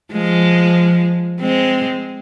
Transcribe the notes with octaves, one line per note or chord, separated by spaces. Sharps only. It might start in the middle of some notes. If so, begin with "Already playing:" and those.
F3 G#3
G#3 C4